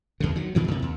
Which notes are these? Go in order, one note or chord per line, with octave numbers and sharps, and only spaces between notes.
E2 G2 D3
D#3 F#3
G2 A#2 D#3 E3
F#2 C3
D#2